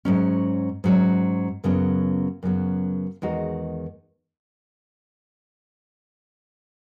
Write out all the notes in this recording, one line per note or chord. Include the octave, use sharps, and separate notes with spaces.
G#2 F#3 C#4
G#2 F#3 C#4
F#2 C#3 F#3 B3
F#2 C#3 F#3 B3
E2 D#3 G#3 D#4 F#4